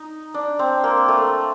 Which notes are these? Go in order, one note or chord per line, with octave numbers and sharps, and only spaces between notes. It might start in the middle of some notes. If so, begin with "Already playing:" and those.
Already playing: D#4
D4
C4
A#3
A3